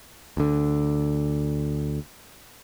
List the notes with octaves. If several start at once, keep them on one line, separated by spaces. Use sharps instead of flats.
D2 D3